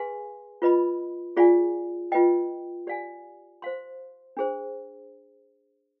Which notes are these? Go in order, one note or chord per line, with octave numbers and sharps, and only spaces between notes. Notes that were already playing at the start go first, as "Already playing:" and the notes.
Already playing: G#4 B4 F5 G#5 C6
F4 B4 D#5 B5
F4 G#4 D5 F5 G#5
F4 B4 D#5 G5
G4 D5 F5 G#5
C5 F5 C6
D4 G#4 C5